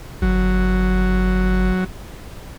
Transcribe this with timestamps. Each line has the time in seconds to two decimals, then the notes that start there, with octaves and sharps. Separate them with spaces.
0.22 G1 F#3